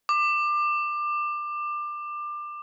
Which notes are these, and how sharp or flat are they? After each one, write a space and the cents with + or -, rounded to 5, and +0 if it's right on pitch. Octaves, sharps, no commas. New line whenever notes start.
D6 +25